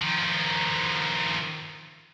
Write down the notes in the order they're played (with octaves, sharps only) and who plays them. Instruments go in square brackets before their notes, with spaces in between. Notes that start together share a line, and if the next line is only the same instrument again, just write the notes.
[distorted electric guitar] D#3 F3